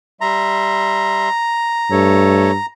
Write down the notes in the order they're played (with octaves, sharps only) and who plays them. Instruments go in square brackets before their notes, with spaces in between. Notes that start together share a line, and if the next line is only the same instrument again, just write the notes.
[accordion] G3 E5 C6 [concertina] A#5
[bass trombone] G2 [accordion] A3 A4 C#5